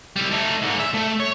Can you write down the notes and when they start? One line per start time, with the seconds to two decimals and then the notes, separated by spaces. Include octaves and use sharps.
0.16 G3 E4
0.31 A3 D#4
0.62 G#2 D3
0.79 E5
0.94 A3
1.20 C#5